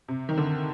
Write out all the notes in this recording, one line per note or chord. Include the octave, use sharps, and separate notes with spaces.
C3
D#3
D3